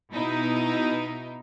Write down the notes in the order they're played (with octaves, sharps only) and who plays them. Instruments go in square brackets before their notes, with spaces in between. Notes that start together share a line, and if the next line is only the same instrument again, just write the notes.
[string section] B2 D#4 E4